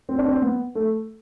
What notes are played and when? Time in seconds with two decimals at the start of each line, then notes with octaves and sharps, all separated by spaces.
0.09 C4
0.18 D4
0.28 C4
0.42 B3
0.75 A3